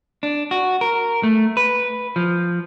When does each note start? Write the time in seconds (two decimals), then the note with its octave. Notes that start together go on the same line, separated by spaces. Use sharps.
0.23 D4
0.51 F#4
0.81 A#4
1.23 A3
1.57 B4
2.16 F3